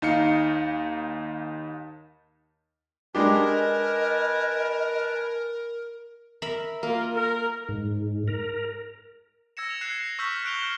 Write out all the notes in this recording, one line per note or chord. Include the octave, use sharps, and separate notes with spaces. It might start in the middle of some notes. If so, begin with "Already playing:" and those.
D#2 D#4 F5 C#7
G#3 D4 G4 A#4 B4 D#5 G#5 A5
A#4 E5 B5
A#3 F4 A#4
A#4 A#5
G#2
A#4
E6 G#6 A#6 C#7 E7
G#6 F7
F#6 G#6 C7 C#7 E7
C#6 E6 F6 G6 B6 F#7
F#6 G6 D7 E7 F7 G7
F6